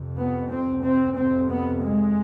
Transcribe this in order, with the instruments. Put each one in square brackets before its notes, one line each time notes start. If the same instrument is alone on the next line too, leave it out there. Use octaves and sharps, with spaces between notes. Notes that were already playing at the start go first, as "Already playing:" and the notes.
Already playing: [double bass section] F2 C3
B3
C4
C4
F2 C3 C4
B3
G#3